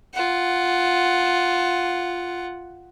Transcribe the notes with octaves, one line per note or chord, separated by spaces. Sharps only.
F4 F#5